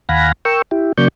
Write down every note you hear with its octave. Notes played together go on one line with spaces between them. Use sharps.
D#2 F5 F#5 G#5 B5 A#6
A#4 G5 C#6 E6
E4 G4
C#3 F#3 A#3 D5 C#6 G6